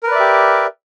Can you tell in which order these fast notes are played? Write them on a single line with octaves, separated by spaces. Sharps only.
A#4 B4 D5 E5 G4